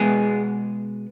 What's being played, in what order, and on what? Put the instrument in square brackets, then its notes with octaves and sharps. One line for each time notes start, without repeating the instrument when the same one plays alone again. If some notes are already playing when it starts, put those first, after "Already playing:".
Already playing: [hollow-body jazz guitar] B2 G#3 B3 G#4